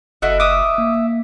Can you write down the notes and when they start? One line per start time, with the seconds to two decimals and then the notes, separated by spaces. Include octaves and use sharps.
0.22 F#1 E4 F#4 A4 D#5
0.40 E5 D6 D#6
0.78 A#3